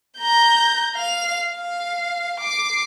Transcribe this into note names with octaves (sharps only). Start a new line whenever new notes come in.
A#5 G6
F5 F7
F5
D6 C7